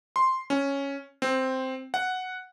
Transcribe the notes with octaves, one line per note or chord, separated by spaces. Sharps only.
C6
C#4
C4
F#5